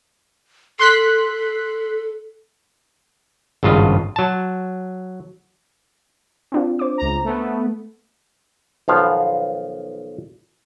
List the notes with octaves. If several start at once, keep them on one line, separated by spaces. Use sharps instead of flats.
A4 C6 F#6 B6
G#1 G2 C#3 F4 D#5
F#3 A5
C4 D4 F4
C5 D6
C#2 A#5
A3 B3
B1 D#3 F3 B3 F5